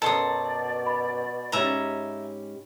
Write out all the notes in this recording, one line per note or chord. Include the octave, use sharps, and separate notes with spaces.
F#2 B2 F#3 A4 D5 A5 C6 D#6
B5
G#2 C#4 G4 E5 A#5